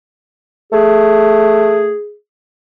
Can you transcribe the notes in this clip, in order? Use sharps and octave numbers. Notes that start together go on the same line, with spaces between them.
A3 G#4